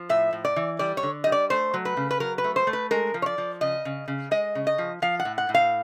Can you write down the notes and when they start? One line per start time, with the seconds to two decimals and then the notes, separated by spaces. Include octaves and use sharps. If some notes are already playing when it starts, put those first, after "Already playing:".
Already playing: F3
0.09 A2 E5
0.33 A2
0.45 D5
0.56 E3
0.79 G3 D5
0.97 C#5
1.03 D3
1.24 G3 D#5
1.32 D5
1.50 A3 C5
1.74 F#3
1.85 B4
1.97 C#3
2.11 B4
2.20 F#3 A#4
2.38 B4
2.44 A3
2.56 C5
2.67 A3
2.73 B4
2.91 G#3 A#4
3.14 F3
3.22 C#5
3.26 D5
3.38 F3
3.61 C#3 D#5
3.85 C#3
4.08 C#3
4.31 G#3 D#5
4.55 C#3
4.67 D#5
4.78 F3
5.02 F3 F5
5.20 F#5
5.25 A2
5.38 F#5
5.49 A2
5.55 F5